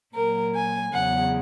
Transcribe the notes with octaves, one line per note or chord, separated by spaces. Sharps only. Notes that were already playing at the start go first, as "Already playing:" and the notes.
A#2 F#3 A#4
G#5
E2 C#3 F#3 F#5